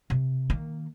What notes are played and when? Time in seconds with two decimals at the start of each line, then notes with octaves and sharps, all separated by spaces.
0.10 C3
0.50 D#3 A#3